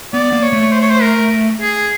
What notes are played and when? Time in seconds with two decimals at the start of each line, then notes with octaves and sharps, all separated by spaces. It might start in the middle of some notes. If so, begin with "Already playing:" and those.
0.13 B3 D5
0.33 A#3
0.42 C#5
0.53 A3
0.72 C5
0.82 C#5
0.90 C5
1.02 A#4
1.61 G#4